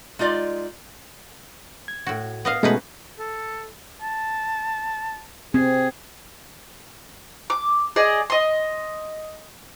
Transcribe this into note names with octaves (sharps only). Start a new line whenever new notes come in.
G#3 D#4 F4 D5
G#6
A2 F#4
B3 D#5 F5
B2 G#3 A3 C#4 D#4 B4
A4
A5
C4 G#4
D6
G#4 D5 D#5
D#5 C6